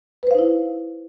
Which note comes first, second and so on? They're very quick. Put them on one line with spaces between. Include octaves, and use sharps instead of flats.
B4 C5 F5 D#4 E4